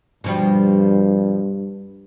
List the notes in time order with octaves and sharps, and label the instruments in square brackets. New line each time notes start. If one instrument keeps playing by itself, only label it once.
[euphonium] G2 [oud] B2 F3 G3